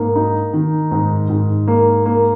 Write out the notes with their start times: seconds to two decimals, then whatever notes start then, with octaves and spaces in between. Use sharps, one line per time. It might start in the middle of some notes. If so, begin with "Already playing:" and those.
Already playing: G#2 A#3
0.16 D#4
0.53 D#3
0.91 G#2
1.29 G#2
1.68 A#3
2.06 A#3